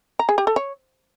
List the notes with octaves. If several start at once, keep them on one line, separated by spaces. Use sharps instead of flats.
A#5
G#4
G4
A4
C#5